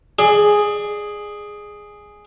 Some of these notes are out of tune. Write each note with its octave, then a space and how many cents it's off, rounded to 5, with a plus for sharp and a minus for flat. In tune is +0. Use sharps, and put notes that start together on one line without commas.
G#4 +0 D5 +30